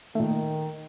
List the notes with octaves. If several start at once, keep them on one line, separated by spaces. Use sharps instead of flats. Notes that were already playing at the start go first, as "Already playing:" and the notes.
A#2 D#3 A3